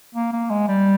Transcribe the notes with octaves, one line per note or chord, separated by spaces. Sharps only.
A#3
A#3
G#3
G3